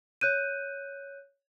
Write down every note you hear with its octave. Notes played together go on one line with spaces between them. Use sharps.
C#5 F#6 G6 D#7